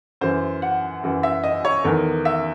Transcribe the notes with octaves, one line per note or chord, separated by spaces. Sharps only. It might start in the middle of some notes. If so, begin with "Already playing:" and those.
F#2 E3 C5
F#5
F#2 E3
E5
D#5
C#5
E2 D#3 A4
E5